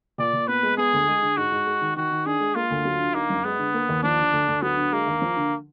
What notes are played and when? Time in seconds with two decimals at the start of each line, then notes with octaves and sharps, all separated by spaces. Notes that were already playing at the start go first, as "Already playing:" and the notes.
0.18 A#2 D5
0.33 A#2
0.48 B3 B4
0.63 G#3
0.77 B3 G#4
0.93 D2
1.07 G#3
1.22 D3
1.37 G#2 F#4
1.52 G#2
1.67 G#3
1.81 D#3
1.96 D#3 F#4
2.11 D#3
2.26 D4 G#4
2.40 G#3
2.55 A#3 F4
2.70 D2
2.85 F#3
3.00 D3
3.14 A#3 D#4
3.29 F#2
3.44 G#3 B3
3.59 D3
3.74 A#3
3.89 D#2
4.03 F3 D4
4.18 D3
4.32 D2
4.48 D2
4.62 F#3 B3
4.77 D3
4.92 G#3 A#3
5.07 D#2
5.22 F3
5.37 D3